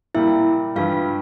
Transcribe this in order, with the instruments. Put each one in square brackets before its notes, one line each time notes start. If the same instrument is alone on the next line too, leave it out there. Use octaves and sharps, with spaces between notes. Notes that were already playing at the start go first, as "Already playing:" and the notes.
[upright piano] A#2 G3 A#3 [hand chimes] E4 E5
[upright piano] G2 E3 G3 [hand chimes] F4 F5